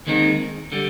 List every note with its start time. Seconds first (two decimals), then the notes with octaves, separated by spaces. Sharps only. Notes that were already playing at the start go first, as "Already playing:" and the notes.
0.06 D#2 D#3 G#3 C4 D#4
0.72 D3 G3